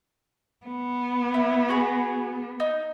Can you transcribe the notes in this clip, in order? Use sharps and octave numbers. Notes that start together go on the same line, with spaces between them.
B3
E4
F#4 G#4
D#4